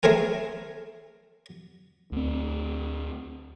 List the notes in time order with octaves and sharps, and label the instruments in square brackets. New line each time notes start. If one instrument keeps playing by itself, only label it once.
[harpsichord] A3 C4 G#4 A#4 G#5
[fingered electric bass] D2 C4